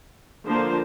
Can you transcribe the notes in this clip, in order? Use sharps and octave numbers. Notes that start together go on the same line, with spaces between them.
D3 F3 A#3 F4 C5